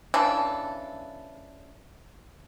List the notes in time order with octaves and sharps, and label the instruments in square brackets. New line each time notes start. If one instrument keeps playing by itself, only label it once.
[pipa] C#3 E3 D4 A4